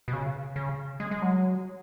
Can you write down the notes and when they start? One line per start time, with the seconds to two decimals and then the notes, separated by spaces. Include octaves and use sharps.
0.08 B2
0.13 C#3
0.56 C#3
1.00 G#3
1.11 G#3
1.22 F#3